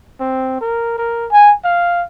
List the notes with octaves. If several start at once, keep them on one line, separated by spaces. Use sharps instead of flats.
C4
A#4
A#4
G#5
F5